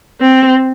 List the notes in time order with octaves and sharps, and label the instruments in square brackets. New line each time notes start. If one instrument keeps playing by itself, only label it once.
[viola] C4